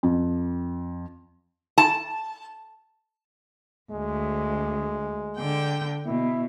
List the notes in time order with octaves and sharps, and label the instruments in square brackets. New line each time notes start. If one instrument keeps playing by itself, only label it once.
[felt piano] F2
[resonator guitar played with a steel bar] A5
[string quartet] D2 [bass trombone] G#3
[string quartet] D3 G5
[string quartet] B2 [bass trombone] E4